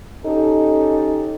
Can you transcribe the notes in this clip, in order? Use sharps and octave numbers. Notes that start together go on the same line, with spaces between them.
C#4 D#4 G4 A4